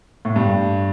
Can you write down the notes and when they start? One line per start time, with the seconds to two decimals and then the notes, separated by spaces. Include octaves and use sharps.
0.25 A2
0.36 G2